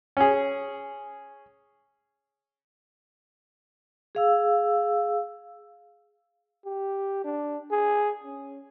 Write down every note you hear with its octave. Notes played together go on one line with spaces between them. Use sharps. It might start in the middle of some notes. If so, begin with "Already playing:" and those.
C#4 G#4
G#4 F5 E6
G4
D4
G#4
C#4